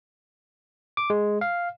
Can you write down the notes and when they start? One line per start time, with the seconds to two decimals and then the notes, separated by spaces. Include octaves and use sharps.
0.97 D6
1.10 G#3
1.41 F5